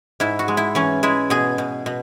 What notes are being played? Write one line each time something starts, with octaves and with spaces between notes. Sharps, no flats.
G#2 E4
F#4
G#3
E4
E3 C#4
G#3 E4
B2 G#4
B2
B2